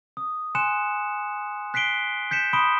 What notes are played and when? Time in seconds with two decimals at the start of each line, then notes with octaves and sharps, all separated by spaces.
0.17 D#6
0.55 G#5 C6 F#6 C#7 E7
1.74 F#6 B6 C7 D7 G7
2.31 G6 B6 C#7 E7
2.53 B5 C6 D#6 D7 G7